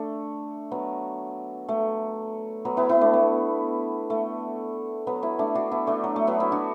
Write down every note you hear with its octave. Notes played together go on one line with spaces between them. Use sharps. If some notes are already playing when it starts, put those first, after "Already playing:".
Already playing: A3 D4
F#3 B3
A3
F#3 B3
B3 E4
B3 E4
A3 D4
A3
A3
F#3 B3
B3 E4
A3 D4
D4 F#4
B3 E4
A3 D4
F#3
A3
F#3 B3
B3 E4
D4 F#4